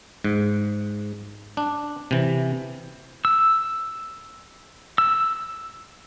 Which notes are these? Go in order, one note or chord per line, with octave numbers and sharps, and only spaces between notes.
G#2
D4
C3 E3
E6
E6